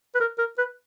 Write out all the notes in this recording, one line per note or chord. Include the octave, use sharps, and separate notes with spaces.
B4
A#4
A#4
B4